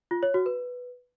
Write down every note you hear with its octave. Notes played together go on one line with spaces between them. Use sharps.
F4
C#5
F#4
B4